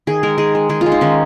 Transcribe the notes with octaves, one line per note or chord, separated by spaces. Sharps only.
D#3 G#4
G#3 A#4
D#3 G#4
G#3
D#3 G#4
F4
G#3
D#4
D#3 C#4